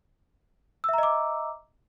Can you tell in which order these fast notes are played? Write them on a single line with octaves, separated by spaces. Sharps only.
E6 E5 A#5 D#5 D6